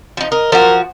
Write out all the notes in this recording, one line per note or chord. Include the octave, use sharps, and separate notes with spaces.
F3 D#4
A#4 D#5
F3 F#4 A#4